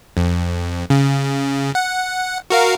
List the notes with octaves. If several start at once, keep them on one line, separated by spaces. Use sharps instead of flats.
F2
C#3
F#5
F#4 A#4 F5